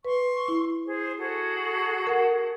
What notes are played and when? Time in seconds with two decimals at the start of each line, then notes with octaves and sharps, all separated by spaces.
0.05 B4 C6 C#6
0.48 E4
0.85 G#4 C5
1.19 F#4 G#4 A4
2.07 A#4 F#5